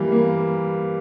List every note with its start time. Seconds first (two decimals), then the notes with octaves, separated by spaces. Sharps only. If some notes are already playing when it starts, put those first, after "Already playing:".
Already playing: E3 G3 A#3
0.12 A#3